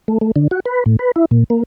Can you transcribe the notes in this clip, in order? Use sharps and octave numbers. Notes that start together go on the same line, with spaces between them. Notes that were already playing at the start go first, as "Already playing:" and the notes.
A3
A3
D3
F#4
B4
A2
B4
E4
A#2
A#3